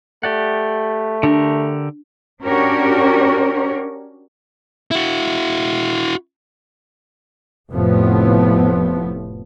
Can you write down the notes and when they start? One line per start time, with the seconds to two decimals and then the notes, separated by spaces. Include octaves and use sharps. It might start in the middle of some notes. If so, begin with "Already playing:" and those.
0.23 A3 G4 D5 F#5
1.23 D3 D4 G4 A#4
2.43 C#4 D4 F#4 G4 A#4 C#5
4.91 E4 F#4
7.72 F1 F2 A2 F3 B3